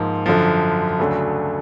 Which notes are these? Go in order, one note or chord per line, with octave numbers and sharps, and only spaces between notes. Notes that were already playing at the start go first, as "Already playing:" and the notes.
Already playing: G#2 F3 A#3
F#2 D3 F3
D2 C#3 F#3 A3 D4